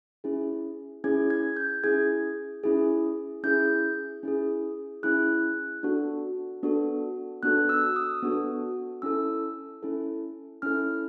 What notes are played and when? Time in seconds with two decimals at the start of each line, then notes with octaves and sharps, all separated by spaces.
0.24 C#4 E4 G#4
1.04 C#4 E4 G#4 G#6
1.30 G#6
1.57 G6
1.84 C#4 E4 G#4 G#6
2.63 C#4 E4 G#4
3.43 C#4 E4 G#4 G6
4.23 C#4 E4 G#4
5.03 C#4 E4 G#4 F#6
5.83 B3 D4 F#4 A4
6.63 B3 D4 F#4 A4
7.43 B3 D4 F#4 A4 F#6
7.69 E6
7.96 D#6
8.22 B3 D4 F#4 A4
9.02 C#4 E4 A4 E6
9.83 C#4 E4 A4
10.62 C#4 E4 A4 F6